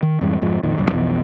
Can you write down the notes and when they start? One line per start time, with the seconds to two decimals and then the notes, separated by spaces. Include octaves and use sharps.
0.03 D#3
0.21 F2 G#2 E3 G3
0.42 F2 G#2 F3
0.63 F2 A#2 D#3
0.78 D#1 C2 F#2
0.91 B1 F2 B2 E3